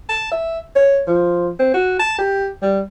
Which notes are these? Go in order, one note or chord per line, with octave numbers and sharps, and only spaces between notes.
A5
E5
C#5
F3
C4
F#4
A5
G4
G3